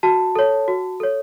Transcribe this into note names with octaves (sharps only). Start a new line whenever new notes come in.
F#4 A5
A4 C#5
F#4
A4 C#5